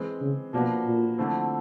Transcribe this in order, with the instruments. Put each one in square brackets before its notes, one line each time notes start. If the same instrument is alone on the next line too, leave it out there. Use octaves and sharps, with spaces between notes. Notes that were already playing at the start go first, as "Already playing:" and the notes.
Already playing: [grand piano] E3 G#3 C4
[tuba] C#3
[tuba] B2 [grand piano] F3 A#3 D4 F#4 B4
[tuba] A#2
[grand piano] D3 F3 A3 C4 E4